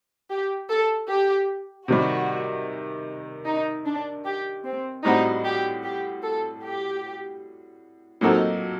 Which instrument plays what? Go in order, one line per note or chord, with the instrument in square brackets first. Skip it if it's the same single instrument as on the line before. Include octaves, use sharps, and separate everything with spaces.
[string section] G4
A4
G4
[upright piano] C3 D#3 G3 [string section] F#4
[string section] D#4
D4
G4
C4
[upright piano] A2 G3 C4 F#4 [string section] D#4
[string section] G4
G4
A4
G4
[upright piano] A#2 F#3 C4 F#4 A4 [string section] D#4